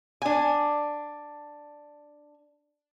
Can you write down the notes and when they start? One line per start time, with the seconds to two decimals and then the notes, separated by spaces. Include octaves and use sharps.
0.22 D4 G#5